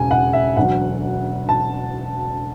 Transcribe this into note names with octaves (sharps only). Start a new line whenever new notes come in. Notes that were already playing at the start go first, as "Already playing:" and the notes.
Already playing: E1 C#3 G#5
F#5
E5
E1 D2 D3 F#3 F#5
A5